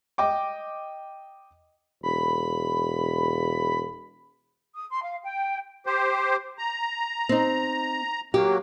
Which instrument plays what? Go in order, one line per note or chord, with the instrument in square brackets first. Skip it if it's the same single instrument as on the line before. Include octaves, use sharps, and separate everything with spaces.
[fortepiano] D#5 G5 D6
[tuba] E1 [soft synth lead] B5
[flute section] D#6
C6
F5
G5
[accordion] G4 C5
A#5
[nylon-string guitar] C4 D#4
[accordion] F#3 A#3 [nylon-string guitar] G4